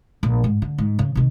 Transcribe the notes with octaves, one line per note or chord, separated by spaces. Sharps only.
A#1
G#2
D3
G#2
C#3
C3 D#3